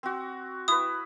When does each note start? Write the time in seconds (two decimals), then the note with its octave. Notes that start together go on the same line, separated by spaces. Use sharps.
0.03 C4 F#4
0.68 E4 B4 D#6